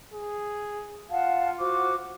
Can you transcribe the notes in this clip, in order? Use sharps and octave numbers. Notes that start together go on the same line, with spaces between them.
G#4
F4 F5 F#5 A5
F#4 C5 D6